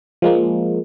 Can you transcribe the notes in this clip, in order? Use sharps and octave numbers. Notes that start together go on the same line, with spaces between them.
F3 G#3 A#3